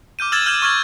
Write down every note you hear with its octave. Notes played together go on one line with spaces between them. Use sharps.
D6 F6 G6 D#7
E6 F6 G#6 A6 E7 F#7
F6 G6 G#6 E7
C#6 F6 G#6 D#7